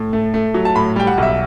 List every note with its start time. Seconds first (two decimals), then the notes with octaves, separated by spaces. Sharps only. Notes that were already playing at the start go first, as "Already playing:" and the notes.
Already playing: A2
0.13 A3
0.34 A3
0.54 F#3
0.65 A5
0.75 A2 B5
0.96 G3 G5
1.07 F#5
1.18 B1
1.23 E5